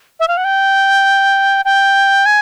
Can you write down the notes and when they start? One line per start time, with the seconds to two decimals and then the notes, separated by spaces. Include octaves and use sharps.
0.20 E5
0.28 F5
0.37 F#5
0.45 G5
1.65 G5
2.26 G#5